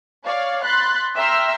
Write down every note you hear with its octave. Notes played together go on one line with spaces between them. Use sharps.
C#5 D5 F5
B5 C6 F#6 A6
E5 G5 A#5 C6 E6 F6